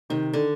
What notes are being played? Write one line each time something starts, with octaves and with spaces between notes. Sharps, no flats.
C3 D#3
D3